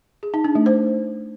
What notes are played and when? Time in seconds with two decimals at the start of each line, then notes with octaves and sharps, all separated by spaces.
0.23 G#4
0.34 D#4
0.44 D4
0.55 A3
0.66 C5